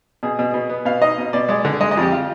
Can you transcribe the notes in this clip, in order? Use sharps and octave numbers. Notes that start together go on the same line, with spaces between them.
B2 G#4
B2
B2
B3
B2 F5
D#4 D#5
B2
B2 D5
G#3 D5
D3
G#3 D#5
D#5
F2 G4
F4